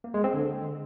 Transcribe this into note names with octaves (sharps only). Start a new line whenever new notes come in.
A#3
G#3
C4
D3